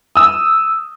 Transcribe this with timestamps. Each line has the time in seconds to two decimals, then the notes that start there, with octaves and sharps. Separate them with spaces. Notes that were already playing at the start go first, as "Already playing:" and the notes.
0.16 D#6 E6